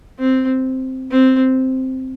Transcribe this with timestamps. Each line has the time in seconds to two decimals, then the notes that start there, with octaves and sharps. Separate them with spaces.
0.19 C4
1.11 C4